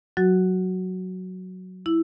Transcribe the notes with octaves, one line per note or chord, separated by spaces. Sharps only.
F#3 F#4
E4